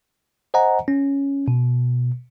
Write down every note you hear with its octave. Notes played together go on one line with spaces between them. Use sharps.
C5 D#5 F#5 G#5 A#5
C#4
B2